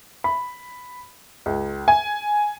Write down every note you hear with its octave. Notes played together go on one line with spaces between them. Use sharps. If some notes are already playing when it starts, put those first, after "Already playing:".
B5
C#2
G#5